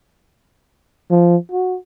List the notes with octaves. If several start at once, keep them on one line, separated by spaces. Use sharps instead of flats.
F3
F#4